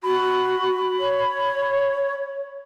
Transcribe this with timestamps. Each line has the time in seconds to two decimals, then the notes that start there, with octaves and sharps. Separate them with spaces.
0.04 F#4 B5
0.99 C#5